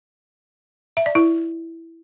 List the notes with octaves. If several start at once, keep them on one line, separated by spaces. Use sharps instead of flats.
E5
D5
E4